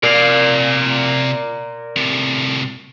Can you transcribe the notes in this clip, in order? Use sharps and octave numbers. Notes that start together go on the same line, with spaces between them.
C3 A#4 D5 F5
A2 C3